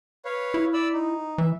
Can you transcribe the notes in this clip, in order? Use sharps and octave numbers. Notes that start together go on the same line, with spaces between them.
B4 C#5 F5
E4
D5 B5 E6
D#4
E3 E5